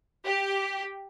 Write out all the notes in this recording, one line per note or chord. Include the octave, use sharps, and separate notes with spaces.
G4